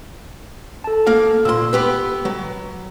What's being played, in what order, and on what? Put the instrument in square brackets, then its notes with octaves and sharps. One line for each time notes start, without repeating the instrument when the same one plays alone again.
[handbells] A4 A5
[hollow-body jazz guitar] A#3 F5
[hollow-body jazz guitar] A#2 C6 [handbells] E6
[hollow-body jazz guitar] B3 G4 B4
F#3